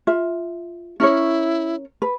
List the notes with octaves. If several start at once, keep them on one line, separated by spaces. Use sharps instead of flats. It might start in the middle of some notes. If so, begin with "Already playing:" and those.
F4 E5
C#4 E4 A#4 C#5
B4